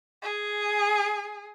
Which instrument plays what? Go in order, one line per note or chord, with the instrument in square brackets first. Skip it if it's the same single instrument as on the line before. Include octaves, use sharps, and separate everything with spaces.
[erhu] G#4